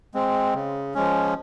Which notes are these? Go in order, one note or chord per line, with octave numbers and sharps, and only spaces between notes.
G#3 C4
C#3
F3 G#3 C#4